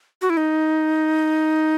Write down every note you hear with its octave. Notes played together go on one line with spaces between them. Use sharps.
F#4
E4
D#4